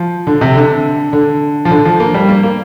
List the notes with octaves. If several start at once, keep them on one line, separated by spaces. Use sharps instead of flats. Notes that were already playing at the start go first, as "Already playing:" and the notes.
Already playing: F3
D3
C3
D3
D3
F3
D3
F3
A#3
G3
A#3
A#3